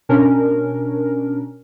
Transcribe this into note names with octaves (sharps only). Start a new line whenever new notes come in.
B2 C#4 D4 A#4